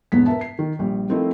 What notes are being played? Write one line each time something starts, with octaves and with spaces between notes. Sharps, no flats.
E1 G#2 B3 B6
A#4 B4 E5 A5
C7
D#3
A#1 G3
F3 A3 C4 D#4 E4 A#4